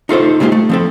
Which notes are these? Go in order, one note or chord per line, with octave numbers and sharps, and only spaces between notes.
D#4 F4 A4 C5
G3 G#3 A#3 C#4 F4 G4
A3
F3 C4 A4